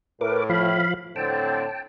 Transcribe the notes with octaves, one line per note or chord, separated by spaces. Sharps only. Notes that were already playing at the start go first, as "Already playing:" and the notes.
A2 A#4 B4 D6
F3 F5 B5
A2 D3 C4 G5 A5